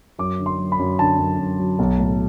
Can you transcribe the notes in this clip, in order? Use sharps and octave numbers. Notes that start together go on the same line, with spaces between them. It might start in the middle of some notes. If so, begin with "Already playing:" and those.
F#2 D6
D3
C6
F#3
B5
F#2
D3 A5
F#2
F#2
F#3
B1
A2